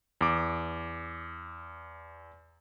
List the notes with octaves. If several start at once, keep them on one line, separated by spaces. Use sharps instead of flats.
E2 D6